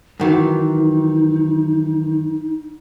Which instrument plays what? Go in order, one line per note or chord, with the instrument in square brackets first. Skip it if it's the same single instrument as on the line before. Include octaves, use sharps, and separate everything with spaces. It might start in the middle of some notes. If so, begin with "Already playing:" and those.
[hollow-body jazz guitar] F#2 D#3 E3 [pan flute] D#4